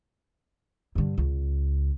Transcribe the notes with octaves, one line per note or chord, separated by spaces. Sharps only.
G2 D3
C#2